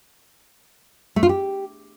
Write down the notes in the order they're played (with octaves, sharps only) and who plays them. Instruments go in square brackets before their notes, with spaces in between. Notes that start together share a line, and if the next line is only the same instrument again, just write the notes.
[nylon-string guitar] A3
F4
G4